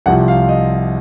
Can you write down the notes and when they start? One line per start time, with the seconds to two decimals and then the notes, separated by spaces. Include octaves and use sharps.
0.06 C2 C3 F3 F#5
0.28 F5
0.49 D#5